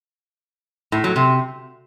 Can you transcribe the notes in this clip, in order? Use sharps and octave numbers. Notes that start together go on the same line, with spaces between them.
A2
F#3
C3